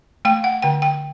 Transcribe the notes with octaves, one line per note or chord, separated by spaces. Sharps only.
A3 G5
F#5
D3 G5
G5